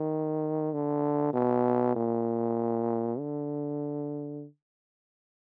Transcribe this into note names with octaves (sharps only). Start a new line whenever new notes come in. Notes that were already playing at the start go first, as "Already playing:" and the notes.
Already playing: D#3
D3
B2
A#2
D3